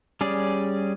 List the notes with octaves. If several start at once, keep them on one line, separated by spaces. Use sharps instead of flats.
G3 C#4 G#4 D5